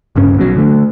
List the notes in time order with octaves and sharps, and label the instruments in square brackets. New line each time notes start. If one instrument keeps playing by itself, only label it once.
[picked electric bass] D1 G2 C#3 C#4
A#1 B2 F3 F#3
D3 A3